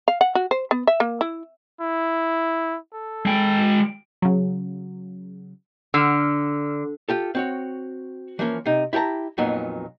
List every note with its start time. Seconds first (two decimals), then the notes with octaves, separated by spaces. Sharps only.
0.08 F5
0.21 F#5
0.35 F#4
0.51 C5
0.71 B3
0.87 E5
1.00 A#3
1.21 E4
1.81 E4
2.94 A4
3.26 G#3 G5
4.22 C#3 F#3
5.94 D3 E6 F6
7.09 F4 G4 A4
7.35 C4 F#4 C#5
8.39 E3 F3 A#3 C#4
8.66 C3 D#4
8.93 E4 G4 C#5 A5 A#5
9.38 F2 A#2 F#3 B3 D#4